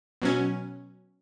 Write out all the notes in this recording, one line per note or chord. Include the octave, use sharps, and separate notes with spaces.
B2 F#3 C#4